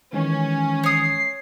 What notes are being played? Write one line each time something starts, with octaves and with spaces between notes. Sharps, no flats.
D#3 E3 G#3 C#4
C#5 D#6 C7